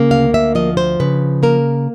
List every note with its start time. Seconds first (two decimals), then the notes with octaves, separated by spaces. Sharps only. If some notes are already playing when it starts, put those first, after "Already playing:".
Already playing: C#3 A#3
0.11 D2 F5
0.34 E5
0.55 F3 D#5
0.77 C5
1.00 C#3 B4
1.43 A#3 A#4